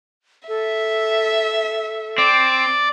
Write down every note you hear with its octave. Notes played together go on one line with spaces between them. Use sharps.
A4 E5
C4 D5